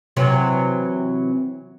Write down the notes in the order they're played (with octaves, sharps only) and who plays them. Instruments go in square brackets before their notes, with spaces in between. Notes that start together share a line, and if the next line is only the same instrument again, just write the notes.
[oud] C3 E3 F#3